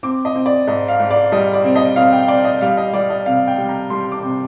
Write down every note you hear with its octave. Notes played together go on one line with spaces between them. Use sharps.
C4 D6
D#5
C4
D5
G#2 D#5
F5
G#2
D5
G3 D#5
D5
C4
D#5
C4 F5
G5
C4 D5
D#5
G3 F5
D#5
G3 D5
D#5
C3 F5
G5
G3
A#5
G3 C6
D6
C3